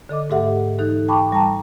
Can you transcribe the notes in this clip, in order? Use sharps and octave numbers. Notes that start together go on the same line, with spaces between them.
D3 A4 D#5 D6
G#2 A3 G4 A4 E5 F#5
E3 D#4 A4 F#6
G5 A5 B5 C#6 D6
G3 G5 A5 A#5